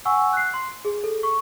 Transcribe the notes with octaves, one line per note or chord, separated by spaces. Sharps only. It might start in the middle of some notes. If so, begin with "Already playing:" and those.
F#5 G#5 C#6 E6
F#6 C7
C6
G#4
A4
C#6